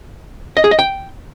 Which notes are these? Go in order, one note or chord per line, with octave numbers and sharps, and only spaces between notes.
D#5
G#4
D#5
G5